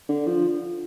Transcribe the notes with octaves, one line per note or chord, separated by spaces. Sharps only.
D3
F3